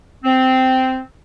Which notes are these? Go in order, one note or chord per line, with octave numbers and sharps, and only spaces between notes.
C4